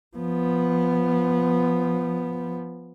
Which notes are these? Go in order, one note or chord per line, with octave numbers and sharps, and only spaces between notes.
F3 B3